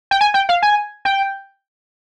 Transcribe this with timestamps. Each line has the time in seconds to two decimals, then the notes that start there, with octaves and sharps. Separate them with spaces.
0.11 G5
0.21 G#5
0.34 G5
0.49 F5
0.62 G#5
1.05 G5